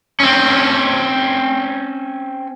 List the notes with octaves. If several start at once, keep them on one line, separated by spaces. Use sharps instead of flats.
C4 C#4